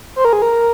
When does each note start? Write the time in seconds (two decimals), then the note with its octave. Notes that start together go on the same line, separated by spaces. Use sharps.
0.16 C5
0.25 A#4
0.33 G#4
0.42 A#4